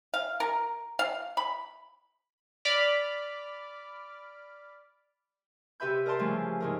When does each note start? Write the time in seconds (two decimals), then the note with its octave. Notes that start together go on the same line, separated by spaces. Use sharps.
0.14 F5
0.40 A#4
0.99 F5
1.37 B5
2.65 D5 B5 D6 F6
5.80 C3 G4 B4 E5 B5 G6
6.06 A#4 D5 A5 C6
6.19 C#3 E3 F3 G3 A3
6.60 G#2 C#3 A#4